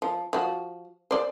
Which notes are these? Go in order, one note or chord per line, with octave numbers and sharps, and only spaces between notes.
F3
F3 F#4
C5 D5